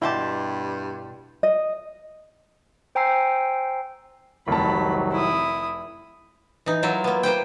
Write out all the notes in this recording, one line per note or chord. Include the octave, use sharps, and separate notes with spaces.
G2 B2 E4 G4 A5 C6 D6
D#5
C5 G5 G#5 A#5 E6 C7
F1 C2 D#3 F#3 A5 B5
E4 D#6
E3 D#4
F#3 E4 F4 A#4
A#3 B3
A#3 B4 C5 G5